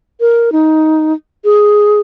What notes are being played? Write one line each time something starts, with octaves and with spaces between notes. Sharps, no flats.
A#4
D#4
G#4